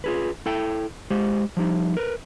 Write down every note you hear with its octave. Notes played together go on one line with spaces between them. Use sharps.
F4 G#4 B4
E4 A4 G5
G#3 G4 C5
F3 G3 D#4
A#4 B4